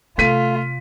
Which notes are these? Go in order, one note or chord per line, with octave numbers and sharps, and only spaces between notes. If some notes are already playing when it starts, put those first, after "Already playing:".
C3 A3 F4 B6 D#7